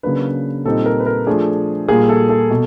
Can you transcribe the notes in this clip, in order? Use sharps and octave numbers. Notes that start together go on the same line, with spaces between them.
C#3 F#3 A#3 D4 B4
A#2 G3 C4 D#4 A4
A#4
B4
A#4
F3 A3 D4 G#4
A#2 G3 A#3 G#4
A4
A4
B2